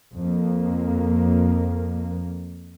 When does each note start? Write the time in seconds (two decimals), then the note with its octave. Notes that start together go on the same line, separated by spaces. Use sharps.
0.14 F2 A#3